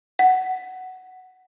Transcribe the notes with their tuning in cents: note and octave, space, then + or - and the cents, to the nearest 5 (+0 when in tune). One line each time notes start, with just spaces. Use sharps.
F#5 +5